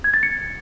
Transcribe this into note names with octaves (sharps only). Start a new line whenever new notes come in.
G#6
A6
C#7